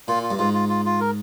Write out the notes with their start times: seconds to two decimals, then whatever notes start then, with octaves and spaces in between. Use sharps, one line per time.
0.08 A#2 F4
0.23 F4
0.31 G2
0.39 G#2 F4
0.53 F4
0.69 F4
0.85 F4
1.01 A#4